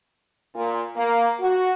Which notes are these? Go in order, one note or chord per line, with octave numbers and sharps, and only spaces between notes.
A#2
A#3
F#4